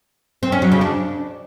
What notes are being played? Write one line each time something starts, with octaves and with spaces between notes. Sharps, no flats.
C4
C#4
F#3
C#3
D4